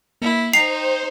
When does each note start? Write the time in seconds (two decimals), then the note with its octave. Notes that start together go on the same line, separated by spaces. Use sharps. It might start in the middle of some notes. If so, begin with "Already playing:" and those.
0.22 A#3 E4
0.53 D#4 C5 G5 C7 F7